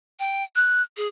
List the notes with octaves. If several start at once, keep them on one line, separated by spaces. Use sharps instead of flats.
G5
F#6
G#4